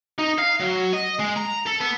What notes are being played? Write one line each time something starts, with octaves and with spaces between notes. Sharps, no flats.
D#4
F5
F#3
D#5
G#3
A#5
A4
B3